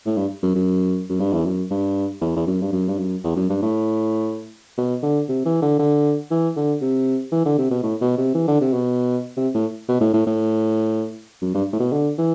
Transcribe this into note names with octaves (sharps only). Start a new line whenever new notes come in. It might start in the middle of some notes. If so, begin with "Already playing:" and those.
A2
G2
F#2
F#2
F#2
G2
E2
F#2
G2
E2
E2
F#2
G2
F#2
G2
F#2
E2
F#2
G2
A2
B2
D3
C3
E3
D3
D3
E3
D3
C3
E3
D3
C3
B2
A2
B2
C3
E3
D3
C3
B2
C3
A2
B2
A2
A2
A2
F#2
G2
A2
B2
D3
E3